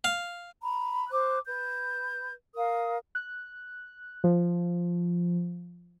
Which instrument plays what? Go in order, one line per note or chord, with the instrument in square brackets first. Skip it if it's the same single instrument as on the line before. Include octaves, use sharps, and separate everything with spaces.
[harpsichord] F5
[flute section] A#5 B5
C5 D6 F#6
B4 G6
A#4 F5 D#6
[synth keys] F#6
F3